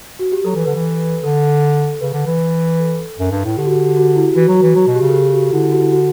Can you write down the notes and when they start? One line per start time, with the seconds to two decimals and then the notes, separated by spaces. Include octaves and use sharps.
0.19 F#4
0.32 G4
0.44 F#3 A4
0.55 E3
0.64 D3 B4
0.76 E3
1.23 D3 A4
2.01 C#3 B4
2.13 D3
2.27 E3
2.80 A4
3.19 F#2
3.31 G2
3.44 A2
3.57 D3 G4
3.67 F#4
3.76 G4
3.87 G4
3.97 F#4
4.16 E4
4.35 E3 F#4
4.48 F#3
4.55 F#4
4.62 E3
4.75 F#3 F#4
4.87 B2
4.95 G4
5.01 C#3
5.10 A4
5.14 G4
5.33 F#4
5.52 D3 E4
5.63 E4
5.72 F#4
5.82 E4
5.92 F#4